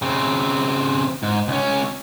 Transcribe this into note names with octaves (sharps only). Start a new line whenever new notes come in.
C#3 C4
G#2
C#2 C#4